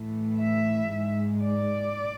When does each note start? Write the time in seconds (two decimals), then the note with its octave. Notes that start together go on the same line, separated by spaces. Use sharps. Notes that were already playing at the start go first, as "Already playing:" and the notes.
Already playing: A2 E3 A3
0.37 E5
0.89 G#2 G#3
1.42 D5